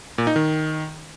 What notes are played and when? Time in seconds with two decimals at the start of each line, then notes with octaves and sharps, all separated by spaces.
0.18 A#2
0.27 D#4
0.36 D#3